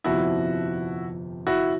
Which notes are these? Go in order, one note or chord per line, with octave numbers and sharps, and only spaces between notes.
G1 F2 C3 F3 E4 F#4
E4 F#4